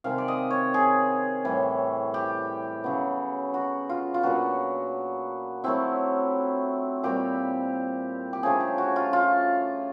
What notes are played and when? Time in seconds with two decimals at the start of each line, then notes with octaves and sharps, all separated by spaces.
0.04 C3 D#3 G#3 F5
0.18 D5
0.28 D#5
0.50 C#5
0.74 G#4
1.45 A2 E3 G3
2.14 G4
2.84 C#3 F#3 B3
3.54 F#4
3.89 F4
4.14 F4
4.23 A#2 F#3 B3 D4 F#4
5.64 F#3 A3 C4 E4
7.03 A#2 G3 C4 G4
8.33 G4
8.43 C#3 F3 A3 D4 G#4
8.60 G4
8.78 F#4
8.96 F4
9.13 F4